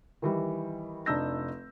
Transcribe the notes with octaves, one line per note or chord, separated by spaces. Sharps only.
D#3 E3 G3
F1 D4 D#4 E6 G6 A#6